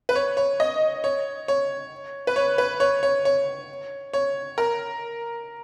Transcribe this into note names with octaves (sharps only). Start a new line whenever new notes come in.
B4
C#5
C#5
D#5
C#5
C#5
B4
C#5
B4
C#5
C#5
C#5
C#5
A#4